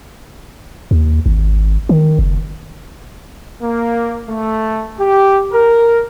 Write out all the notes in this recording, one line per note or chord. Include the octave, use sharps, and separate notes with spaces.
D#2
G#1
D#3
F#1
A#3
A3
G4
A#4